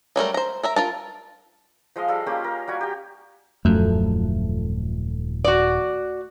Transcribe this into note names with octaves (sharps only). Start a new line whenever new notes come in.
F#3 G3 A3 A#4
C5 A#5
A#4 E5 A#5
F4 A#4 A5
F3 G#3 D#5 F5
G3 G#3 A4 F5
A#3 C#4 F4 G4
A#4
G3 F#4 G#5
G4 G5
D#1 F#2 F3 A3
F#4 D5